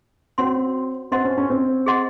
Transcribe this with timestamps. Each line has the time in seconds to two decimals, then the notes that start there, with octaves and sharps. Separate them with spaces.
0.38 C4 C#4 F#4 C#5 F#5 C6
1.12 C4 C5 D#5 F#5 C6
1.25 C#4
1.38 C#4
1.50 C4
1.86 G#4 D#5 F#5 C6